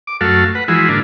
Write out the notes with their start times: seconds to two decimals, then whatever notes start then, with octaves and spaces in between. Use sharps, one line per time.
0.07 D6
0.21 F#2 A3 F#4 A4 F5
0.55 B4 F#5
0.68 E3 F3 G#3 E4 F#4 G#4
0.89 G#2 D3 A#3 D4 F4